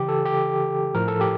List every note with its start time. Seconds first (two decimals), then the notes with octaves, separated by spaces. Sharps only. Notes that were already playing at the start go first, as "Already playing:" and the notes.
Already playing: C#3 E3 G4
0.09 A4
0.25 G4
0.94 A2 F3 A#4
1.08 A4
1.21 G4